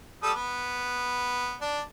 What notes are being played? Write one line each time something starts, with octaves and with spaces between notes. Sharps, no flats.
G3 A4 D#6
B3
D4